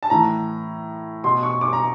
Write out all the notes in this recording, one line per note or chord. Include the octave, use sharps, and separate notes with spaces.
A5
A2 E3 A#5
B2 C6
C#6
D6
A#5